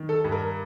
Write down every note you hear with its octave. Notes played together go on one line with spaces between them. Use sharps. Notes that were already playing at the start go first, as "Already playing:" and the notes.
Already playing: D#3
A4
G2
A#4